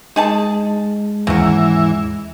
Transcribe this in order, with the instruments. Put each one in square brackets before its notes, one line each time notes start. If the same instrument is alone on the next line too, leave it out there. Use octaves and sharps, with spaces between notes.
[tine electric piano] G#3 [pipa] D#4 G#4 A5
[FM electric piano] D#2 G#2 A#6 [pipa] C#3 F#3 [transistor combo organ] E3